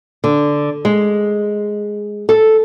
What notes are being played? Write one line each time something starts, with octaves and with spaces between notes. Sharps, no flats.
D3
G#3
A4